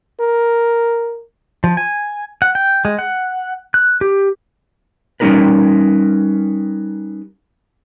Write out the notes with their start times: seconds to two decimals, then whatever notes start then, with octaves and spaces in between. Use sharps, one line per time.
0.20 A#4
1.64 F3
1.77 G#5
2.42 F#5
2.55 G5
2.85 G#3
2.99 F#5
3.74 F#6
4.01 G4
5.20 G3 C#4 D#4 A#4 B4